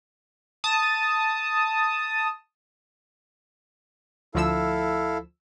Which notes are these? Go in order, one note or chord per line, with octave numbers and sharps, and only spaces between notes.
A5 D#6
D2 F3 E4 A4 F5 E6